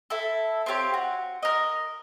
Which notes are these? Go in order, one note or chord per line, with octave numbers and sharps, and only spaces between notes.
E4 A4
C4 F4 G4 C#5
F#4
A#4 D#5